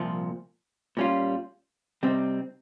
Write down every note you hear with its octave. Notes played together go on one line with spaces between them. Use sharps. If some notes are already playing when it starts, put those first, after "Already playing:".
Already playing: C2 A#2 F3
A#2 G3 C#4 F4
C3 G3 C4 D#4